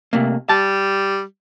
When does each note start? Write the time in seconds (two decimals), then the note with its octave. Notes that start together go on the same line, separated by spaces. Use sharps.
0.13 C3 A3 A#3
0.49 G3 A5